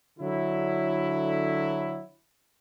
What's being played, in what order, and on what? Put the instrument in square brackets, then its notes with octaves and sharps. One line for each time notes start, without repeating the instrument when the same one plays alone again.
[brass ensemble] D3 F#3 E4